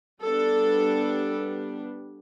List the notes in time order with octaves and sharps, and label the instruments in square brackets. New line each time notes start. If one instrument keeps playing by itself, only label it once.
[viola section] G3 B3 D4 A4